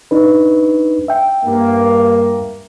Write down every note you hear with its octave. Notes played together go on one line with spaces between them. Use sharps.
D4 D#4 B4
E5 G5
G2 A#3